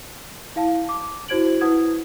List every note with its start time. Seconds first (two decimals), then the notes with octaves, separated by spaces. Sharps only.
0.56 E4 F5 A5
0.89 D6
1.28 E4 F#4 C5 G#6 D7 F#7
1.61 E4 B4 F#5 D#6 G#6